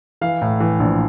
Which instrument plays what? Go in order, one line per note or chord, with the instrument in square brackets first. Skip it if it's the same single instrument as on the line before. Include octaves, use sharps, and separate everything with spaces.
[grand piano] E3 F5
A2
E3
A#1